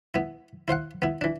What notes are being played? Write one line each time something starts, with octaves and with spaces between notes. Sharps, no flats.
B3 E4
E4 C5 F5 F#5
B3 E4
E3 D4